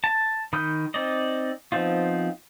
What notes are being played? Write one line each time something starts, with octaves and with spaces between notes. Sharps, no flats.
A5
D#3 B5 D#6 F6 G6
C4 D#4 D5 D#5
F3 B3 C4 D#4 F4